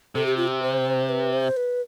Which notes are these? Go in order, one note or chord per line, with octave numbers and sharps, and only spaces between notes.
C3 A4
G4
F4
G4
C5
B4
C5
B4